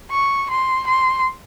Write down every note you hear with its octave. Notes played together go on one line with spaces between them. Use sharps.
C#6
C6
C6